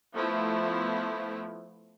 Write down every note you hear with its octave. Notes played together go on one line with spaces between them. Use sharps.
F3 A3 B3 E4